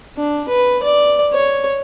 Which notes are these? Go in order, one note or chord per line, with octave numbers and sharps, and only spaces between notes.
D4
B4
D5
C#5